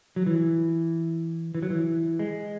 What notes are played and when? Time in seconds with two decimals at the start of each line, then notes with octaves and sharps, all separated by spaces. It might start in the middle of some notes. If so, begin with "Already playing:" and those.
0.16 F#3
0.26 E3
1.55 E3
1.63 F#3
1.70 E3
2.19 G#3